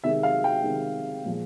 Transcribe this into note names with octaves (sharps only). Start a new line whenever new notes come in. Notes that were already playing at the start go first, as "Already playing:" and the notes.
C3 D#3 G#3 E5
F5
G5
C3 D#3 G#3
A#2 F3 G#3